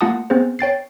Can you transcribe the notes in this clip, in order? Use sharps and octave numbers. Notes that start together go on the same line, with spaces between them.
A3 A#3 F4 F#5 A5 D#6
B3 C4 G#4 C5
C#5 G5 A6 C7